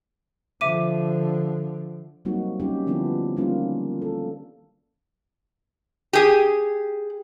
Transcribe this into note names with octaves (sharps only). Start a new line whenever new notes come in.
D3 F3 E5 D6 D#7
F#3 G3 A#3 C4 D#4 F#4
G3 C#4 D#4 G4
D3 F3 B3 D4 E4
D#3 G3 A#3 C#4 F4 G4
A4
G4 G#4